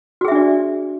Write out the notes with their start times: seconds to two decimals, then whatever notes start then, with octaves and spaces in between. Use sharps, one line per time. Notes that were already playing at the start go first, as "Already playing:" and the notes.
0.21 F#4
0.25 G#4
0.28 E5
0.32 D4
0.35 D5